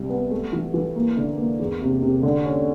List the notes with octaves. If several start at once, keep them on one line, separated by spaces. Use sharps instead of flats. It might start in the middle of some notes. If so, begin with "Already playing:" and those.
Already playing: C2 G3
B3
A3
E3
E3
A#3
D3
A#3
E2
C3
C3
D3
C#4